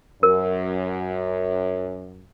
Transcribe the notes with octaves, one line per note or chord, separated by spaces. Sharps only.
F#2 A#4